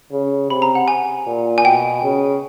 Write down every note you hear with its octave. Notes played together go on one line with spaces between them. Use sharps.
C#3
C3 B5
A#5
F#5
G#5
A#2
G#5
B2 G5
C#3